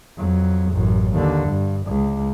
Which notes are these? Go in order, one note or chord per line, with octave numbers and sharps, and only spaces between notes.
F2 F#3
A1 F#2
D#2 D3
G2
C#2